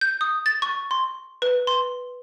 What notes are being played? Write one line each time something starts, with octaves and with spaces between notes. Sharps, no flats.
G6
D#6
A6
C#6
C6
B4
C6